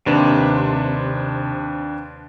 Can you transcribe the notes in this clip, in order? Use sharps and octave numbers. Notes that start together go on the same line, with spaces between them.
D#2 C3 D4 B4